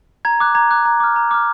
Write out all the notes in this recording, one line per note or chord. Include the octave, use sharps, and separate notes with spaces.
A#5 G#6
D6 F#6
A#5 G#6
D6 F#6
A#5
D6 F6
A#5
D6 F6